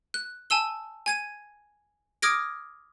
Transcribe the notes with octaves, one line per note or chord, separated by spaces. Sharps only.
F#6
G#5 A5 E6 G7
G#5 G#6 D#7
D6 D#6 F6 G#6 A#6 D7